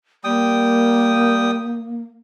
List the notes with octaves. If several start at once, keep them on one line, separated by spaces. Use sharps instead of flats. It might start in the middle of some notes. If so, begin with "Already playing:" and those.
G3 A#3 G5 D#6